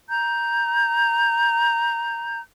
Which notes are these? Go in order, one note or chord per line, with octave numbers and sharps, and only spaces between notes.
A#5 G6